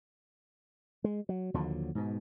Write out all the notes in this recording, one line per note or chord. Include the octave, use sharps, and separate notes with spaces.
G#3
F#3
D#2 D3 F3 F#3
G#2 B2